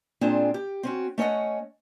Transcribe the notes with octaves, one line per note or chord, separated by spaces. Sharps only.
A#2 C4 D4 F4 G#4
G4
C4 C#4 F#4
A3 C#4 C#5 D#5 F#5